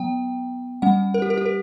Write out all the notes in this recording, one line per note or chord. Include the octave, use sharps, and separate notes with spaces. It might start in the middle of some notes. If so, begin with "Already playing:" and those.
Already playing: F#3 B3 G5
G3 C#4 F#5
A#4
G4
A#4
G4
A#4